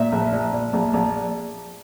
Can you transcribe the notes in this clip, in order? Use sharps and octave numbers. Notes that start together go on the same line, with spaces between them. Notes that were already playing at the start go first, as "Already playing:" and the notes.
Already playing: A#2 E5
A#1
A#2
A#2
A#1
A#1